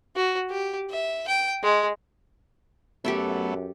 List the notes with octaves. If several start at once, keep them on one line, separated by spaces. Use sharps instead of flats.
F#4
G4
E5
G5
G#3
F#2 F#3 A3 B3 G4 A4 E5